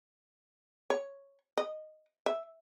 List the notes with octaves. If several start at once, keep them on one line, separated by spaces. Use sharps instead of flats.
C#5
D#5
E5